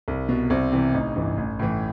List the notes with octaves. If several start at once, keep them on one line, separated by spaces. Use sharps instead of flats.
C2
B2
C2 C4
C3 E3
A1 D#4
G2 E3
A1
A2 E3